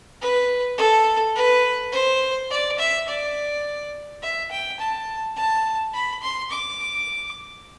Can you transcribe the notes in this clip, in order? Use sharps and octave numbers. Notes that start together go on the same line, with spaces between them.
B4
A4
B4
C5
D5
E5
D5
E5
G5
A5
A5
B5
C6
D6